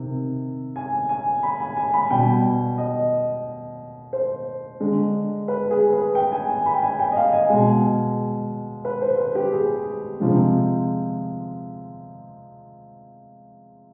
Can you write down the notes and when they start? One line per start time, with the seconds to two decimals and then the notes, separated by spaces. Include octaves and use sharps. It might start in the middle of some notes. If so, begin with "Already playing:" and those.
Already playing: C3 D#3
0.76 G#5
1.09 G#5
1.43 B5
1.60 G#5
1.77 G#5
1.94 B5
2.11 B2 G3 G5
2.78 D#5
4.13 C5
4.80 D3 G#3
5.48 B4
5.71 G#4
5.93 B4
6.15 G5
6.32 G#5
6.49 G#5
6.66 B5
6.74 G5
6.82 G#5
7.00 G5
7.12 D#5
7.16 F5
7.33 G#5
7.50 B2 G#3
8.85 B4
9.02 C5
9.18 B4
9.35 G4
9.52 G#4
10.20 C3 F3 G#3